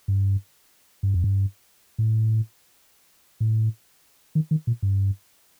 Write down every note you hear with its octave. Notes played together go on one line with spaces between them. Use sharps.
G2
G2
F2
G2
A2
A2
D#3
D#3
A#2
G2